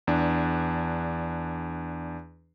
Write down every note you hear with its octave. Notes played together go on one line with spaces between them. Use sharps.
E2 D4